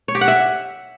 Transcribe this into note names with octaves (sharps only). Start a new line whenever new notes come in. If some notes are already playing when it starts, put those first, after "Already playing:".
C#5
G4
F#5
E5